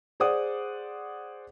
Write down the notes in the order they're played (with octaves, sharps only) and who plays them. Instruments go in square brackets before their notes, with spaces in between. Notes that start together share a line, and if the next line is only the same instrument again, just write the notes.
[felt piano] G#4 C5 D5 F#5 D#6